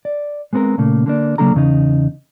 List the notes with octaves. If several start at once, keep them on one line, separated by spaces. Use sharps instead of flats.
D5
G#3 B3 C4 A4 A#4
A#2 C#3 A3 A#3
D3 A#3 D4
C#3 F#3 A#3 D4 A4 A#5
E2 C#3 D#4